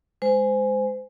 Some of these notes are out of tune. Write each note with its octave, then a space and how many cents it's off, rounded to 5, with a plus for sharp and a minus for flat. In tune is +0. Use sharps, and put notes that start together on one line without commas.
G#3 +0 C5 -25 G#5 +0